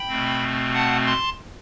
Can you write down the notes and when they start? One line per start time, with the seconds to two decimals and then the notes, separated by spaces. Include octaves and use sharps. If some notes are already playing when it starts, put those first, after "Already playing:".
Already playing: G5 B5
0.08 B2 A3 C4
0.74 F#5 A5
1.06 A5 C6